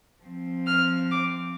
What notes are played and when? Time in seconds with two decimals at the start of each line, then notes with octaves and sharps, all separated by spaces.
0.23 F3 C4
0.66 F6
1.11 D6